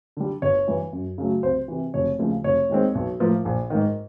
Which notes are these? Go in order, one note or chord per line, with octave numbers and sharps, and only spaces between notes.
D3 G3
G1 C#5
G2 E3
F#2
C#3 F#3 A3
C2 C5
C3 E3
F1 C#5
D#2 C#3 F3 A3
F1 C#5
D#2 D#3 G#3 C4
B1
A2 F3 A#3
A#1
G#2 D#3